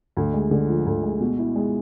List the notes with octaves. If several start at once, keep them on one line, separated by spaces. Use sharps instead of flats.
D2
G#3
D3
F3
D2
G#3
B2
E4
G#3